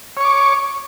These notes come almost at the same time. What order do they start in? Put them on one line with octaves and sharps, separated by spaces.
C#5 C#6 D6